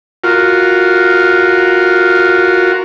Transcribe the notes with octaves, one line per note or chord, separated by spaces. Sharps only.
F4 F#4 A#4